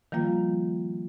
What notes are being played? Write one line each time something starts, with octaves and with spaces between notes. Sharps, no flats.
D#3 F3 G3 A#3 F4